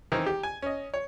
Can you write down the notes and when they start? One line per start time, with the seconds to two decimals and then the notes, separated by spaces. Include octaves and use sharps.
0.12 D#3 E3 C4
0.26 G4
0.43 G#5
0.62 C#4 D#5
0.94 C#5